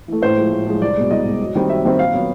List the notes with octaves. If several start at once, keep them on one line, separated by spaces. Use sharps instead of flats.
E3 A3
A2 C5
F3 G#3
A2
F3 G#3
C2 D5
B2 G#3
C2 D#5
B2 G#3
F#2
D#3 G3 C4
F#2 E5
D#3 G3 C4
A#2 F5
F#3 B3